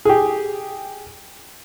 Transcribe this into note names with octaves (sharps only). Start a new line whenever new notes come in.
G4 G#4